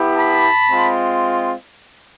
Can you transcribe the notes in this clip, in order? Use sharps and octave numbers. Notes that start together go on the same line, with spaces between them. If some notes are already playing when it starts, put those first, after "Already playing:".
Already playing: B3 E4 G4
A5 B5
G#3 C4 F4